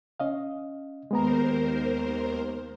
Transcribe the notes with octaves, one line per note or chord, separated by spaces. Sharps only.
C#4 D#5 F5
D#2 G#3 B3 A#4 C5 A#5